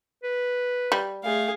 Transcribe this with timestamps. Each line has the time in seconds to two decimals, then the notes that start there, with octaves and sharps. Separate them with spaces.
0.23 B4
0.92 G3
1.24 A3 G#4 F5